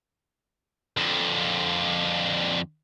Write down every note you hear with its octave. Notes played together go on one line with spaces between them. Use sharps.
F2 D3